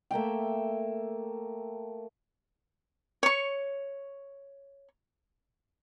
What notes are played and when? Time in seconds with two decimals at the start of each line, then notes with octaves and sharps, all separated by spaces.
0.11 A3 A#3 E5 G5
3.23 C#5 C#6